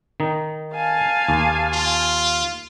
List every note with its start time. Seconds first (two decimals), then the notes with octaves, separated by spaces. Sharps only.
0.20 D#3 D#4
0.74 F5 G#5 A5
1.29 D#2
1.73 F4